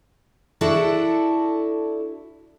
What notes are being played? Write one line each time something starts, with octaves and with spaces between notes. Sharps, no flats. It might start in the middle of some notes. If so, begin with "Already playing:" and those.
D4 E4 F#4 A4